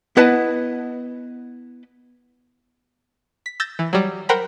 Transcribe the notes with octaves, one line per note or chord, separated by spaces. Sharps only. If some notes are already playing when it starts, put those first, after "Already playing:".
B3 E4 B4 D#5 F#5 A5
B6
E6 G6 A6 A#6
E3
F#3 G3
A#4 C5 F#5 G5 A#5 B5